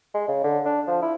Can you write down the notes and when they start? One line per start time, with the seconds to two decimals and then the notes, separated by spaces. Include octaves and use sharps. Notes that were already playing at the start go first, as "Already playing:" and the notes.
0.14 G#3
0.28 C#3
0.44 D3
0.66 D4
0.88 F3
1.02 E4